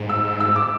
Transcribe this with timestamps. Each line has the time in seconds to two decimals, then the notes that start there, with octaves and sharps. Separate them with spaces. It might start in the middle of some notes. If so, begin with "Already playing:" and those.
Already playing: G#2
0.09 E6
0.40 E6
0.56 D6